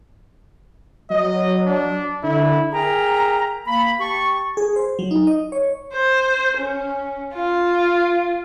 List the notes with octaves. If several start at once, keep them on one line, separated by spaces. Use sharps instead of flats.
F#3 D#5
D4
D3 E4
G#4 A#4 E5 G5 A#5
A#3 B5
G4 A5 C#6
G#4
C5
F#3
D#4
D#5
C#5
C5
C#4
F4